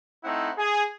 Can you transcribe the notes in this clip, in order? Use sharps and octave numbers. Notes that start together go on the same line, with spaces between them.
A3 C4 D#4 E4 F#5
G#4